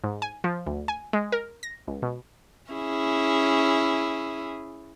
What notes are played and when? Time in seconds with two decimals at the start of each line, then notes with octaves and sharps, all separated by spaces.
0.04 G#2
0.22 G#5
0.44 F3
0.67 D2
0.88 G#5
1.13 G#3
1.32 A#4
1.63 A#6
1.87 C#2
2.02 B2
2.71 C#4 E4 G#4